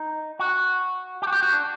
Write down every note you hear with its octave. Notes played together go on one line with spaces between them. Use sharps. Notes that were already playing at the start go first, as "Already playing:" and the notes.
Already playing: D#4
F#4
G4
F#4
G4
F#4
D4